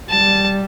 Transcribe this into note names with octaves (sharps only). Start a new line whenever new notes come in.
G3 A5